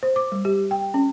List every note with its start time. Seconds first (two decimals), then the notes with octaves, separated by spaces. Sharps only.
0.03 C5
0.16 D6
0.32 G3
0.45 G4
0.71 G5
0.94 C#4